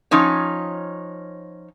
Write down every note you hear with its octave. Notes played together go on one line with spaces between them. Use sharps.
F3 C#4 D#4 C#5